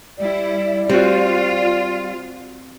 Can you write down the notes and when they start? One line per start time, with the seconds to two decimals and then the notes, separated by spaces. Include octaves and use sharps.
0.18 G3 E4 D5
0.89 G3 C4 F4 F#4